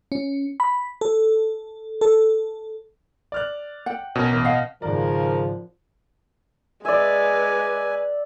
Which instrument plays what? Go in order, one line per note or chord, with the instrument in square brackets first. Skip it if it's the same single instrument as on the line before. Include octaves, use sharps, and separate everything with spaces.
[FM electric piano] C#4
B5
A4
A4
[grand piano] D5 F6 F#6
[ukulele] F#5 G5
[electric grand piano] B2 [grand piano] C#4 A#4 G#5
[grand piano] A1
[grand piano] D#5 [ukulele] F5 F#5
[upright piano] G#1 D5 [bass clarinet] C#3 [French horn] F3 [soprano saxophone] A#4
[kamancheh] G#3 B4 [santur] D5 E5 [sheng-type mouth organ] G#5